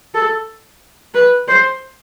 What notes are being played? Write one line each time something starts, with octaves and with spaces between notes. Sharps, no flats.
A4
B4
C5